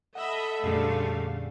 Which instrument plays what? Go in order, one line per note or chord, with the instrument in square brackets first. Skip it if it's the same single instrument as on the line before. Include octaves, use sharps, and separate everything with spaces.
[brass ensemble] A4 [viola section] D#5 E5 B5 [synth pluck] F#5
[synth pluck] F2 A#2 G#4 [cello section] D3 C#4 F5 [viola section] G3 A3